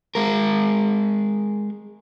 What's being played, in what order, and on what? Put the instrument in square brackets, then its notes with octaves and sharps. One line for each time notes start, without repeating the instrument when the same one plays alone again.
[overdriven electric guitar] G#3 A#4